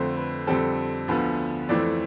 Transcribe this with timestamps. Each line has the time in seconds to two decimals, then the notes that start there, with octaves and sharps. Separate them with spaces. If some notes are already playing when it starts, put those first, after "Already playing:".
Already playing: F2 D3 A3 C4 C5
0.17 B4
0.47 F2 D3 G3 C4 A4
1.08 D2 D3 F3 B3 B4
1.69 F2 E3 A3 C4 D5